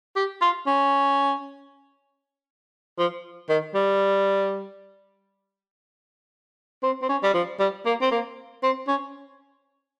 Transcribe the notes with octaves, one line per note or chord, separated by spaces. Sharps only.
G4
F4
C#4
F3
D#3
G3
C4
C4
C#4
G3
F3
G3
A#3
C4
A#3
C4
C#4